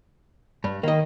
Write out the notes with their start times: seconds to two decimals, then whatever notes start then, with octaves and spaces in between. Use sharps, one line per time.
0.64 G2
0.83 D#3 A#3 D#5